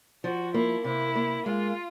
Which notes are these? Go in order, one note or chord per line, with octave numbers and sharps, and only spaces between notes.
F3 F#4
A#3 E4
C3 E4
A#3
G#3 F4